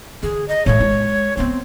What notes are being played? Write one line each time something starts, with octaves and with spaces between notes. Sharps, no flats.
D3 G#4
D#5
A2 G#3 C#5
G#3
A3 B3 C4